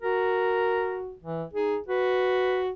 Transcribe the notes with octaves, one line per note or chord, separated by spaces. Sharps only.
F#4 A#4
E3
D#4 G#4
F#4 B4